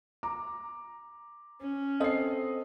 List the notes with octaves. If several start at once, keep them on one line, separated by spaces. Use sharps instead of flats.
A#5 D6
C#4
C4 A4 C5 D#5 C7